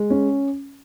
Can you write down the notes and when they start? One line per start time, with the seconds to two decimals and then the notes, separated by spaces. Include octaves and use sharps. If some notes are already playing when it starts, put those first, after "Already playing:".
Already playing: G#3
0.10 C#4